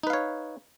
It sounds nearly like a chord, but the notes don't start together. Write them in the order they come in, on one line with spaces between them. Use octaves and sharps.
D#4 B4 F5 C#5